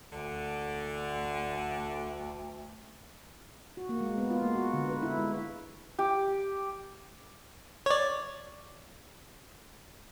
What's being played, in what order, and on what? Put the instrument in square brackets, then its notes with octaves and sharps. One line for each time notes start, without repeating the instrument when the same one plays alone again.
[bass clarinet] D2 [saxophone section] D3
[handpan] F#4
A#3
G#3
B3
F4
A#3
F#4
D3
B4
E4
G#3
[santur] G4
[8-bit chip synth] C#5 D5